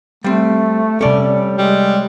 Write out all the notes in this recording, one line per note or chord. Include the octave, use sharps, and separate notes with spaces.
G3 A3 C4
C3 G3 C#4 A4 D5
G3 G#3